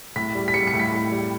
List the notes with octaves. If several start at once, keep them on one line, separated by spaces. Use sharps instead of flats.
A2 B6
G3
B6
G3 C#7
C#7
A2
B6
A2
G3